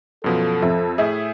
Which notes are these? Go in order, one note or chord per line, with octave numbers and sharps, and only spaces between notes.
F#2 B2 F3 A4
F2 E5
A2 G#4 E5